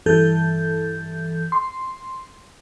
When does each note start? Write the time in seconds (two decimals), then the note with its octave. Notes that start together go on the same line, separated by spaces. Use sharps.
0.06 G2 E3 A4 G6
1.52 C6